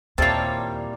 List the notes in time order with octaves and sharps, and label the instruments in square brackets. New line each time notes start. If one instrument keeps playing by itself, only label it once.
[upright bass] D#2 [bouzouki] A#2 G3 [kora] C4 E4 F5 [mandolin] C#5 A5